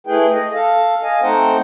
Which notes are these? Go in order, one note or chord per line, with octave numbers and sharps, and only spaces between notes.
A3 E4 G#4 B4 G5
D#5
A4 F5
D#5 F5 G#5
A3 C4 D#4 C5 F#5 G5